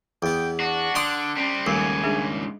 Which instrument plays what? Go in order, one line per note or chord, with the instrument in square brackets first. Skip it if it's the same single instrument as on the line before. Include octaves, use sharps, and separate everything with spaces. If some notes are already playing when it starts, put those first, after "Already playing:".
[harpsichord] E2 B3 [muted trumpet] G5
[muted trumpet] D4 [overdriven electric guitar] F#4
[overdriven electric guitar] D3 [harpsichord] G5 C6 D#6
[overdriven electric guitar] G3 C4 [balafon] C#4
[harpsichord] D#2 [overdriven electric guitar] G#2 C#3 [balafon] G3 A3 A4 [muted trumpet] G#5
[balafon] G#3 D4 G#4